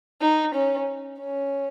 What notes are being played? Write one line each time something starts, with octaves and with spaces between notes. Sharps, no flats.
D#4
C#4
C#4